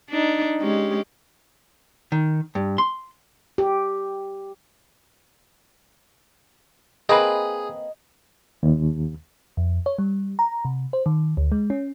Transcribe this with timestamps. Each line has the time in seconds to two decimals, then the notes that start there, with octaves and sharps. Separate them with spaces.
0.10 D4 D#4
0.61 G#3 C#4 G4
2.12 D#3
2.55 G2
2.78 C6
3.58 G4
7.09 A#3 C4 G#4 B4 D#5
8.63 D#2
9.57 F2
9.86 C#5
9.98 G3
10.39 A#5
10.65 C3
10.93 C5
11.06 D#3
11.37 D2
11.52 G#3
11.70 C#4